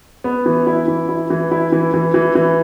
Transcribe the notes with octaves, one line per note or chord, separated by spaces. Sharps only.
B3
E3
E4
E3
E4
E3
E4
E3
E3
E3
E3